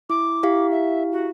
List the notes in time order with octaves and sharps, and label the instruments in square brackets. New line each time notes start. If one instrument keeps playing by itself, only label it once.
[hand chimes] E4 [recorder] D6
[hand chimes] E4 G4 F5
[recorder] E5
F#4